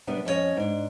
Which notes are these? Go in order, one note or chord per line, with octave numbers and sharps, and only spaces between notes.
F#2 C3 G3 B3 D4
F2 C#4 D4 C#5 D#5
G#2 D4